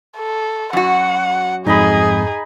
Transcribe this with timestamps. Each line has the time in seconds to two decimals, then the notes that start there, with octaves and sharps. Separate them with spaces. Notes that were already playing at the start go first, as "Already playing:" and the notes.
0.17 A4
0.73 F#2 F#4 F#5
1.66 F2 G#2 D#4 G#4 D#5 B5